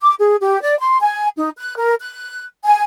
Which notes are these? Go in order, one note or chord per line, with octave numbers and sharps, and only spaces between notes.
D6
G#4
G4
D5
C6
G#5
D#4
F#6
A#4
F#6
G#5